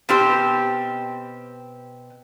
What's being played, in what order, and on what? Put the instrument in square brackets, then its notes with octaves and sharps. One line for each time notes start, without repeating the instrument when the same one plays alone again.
[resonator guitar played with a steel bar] B2 C4 G4